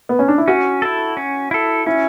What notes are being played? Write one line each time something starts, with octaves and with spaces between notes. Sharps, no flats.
B3
C#4
D4
E4
C#4 F#4
E4 A4
C#4
E4 A4
C#4 E4